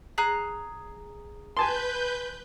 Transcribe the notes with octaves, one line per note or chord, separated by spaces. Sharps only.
G#4 A#5 F#6
B4 G#5 A5 C6 G6